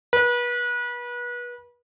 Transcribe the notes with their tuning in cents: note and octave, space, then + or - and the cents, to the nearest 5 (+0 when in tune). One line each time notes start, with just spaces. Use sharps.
B4 -30